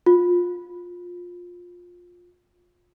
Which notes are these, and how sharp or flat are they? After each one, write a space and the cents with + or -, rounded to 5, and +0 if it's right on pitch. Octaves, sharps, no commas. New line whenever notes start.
F4 +20